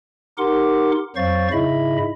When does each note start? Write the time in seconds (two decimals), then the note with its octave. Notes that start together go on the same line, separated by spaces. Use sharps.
0.38 D#4 G4 A#4 F#5 C6 D6
1.16 F2 F#3 C5 F5 C#6 A6
1.52 G#2 C#3 E4 D#5 E5 B5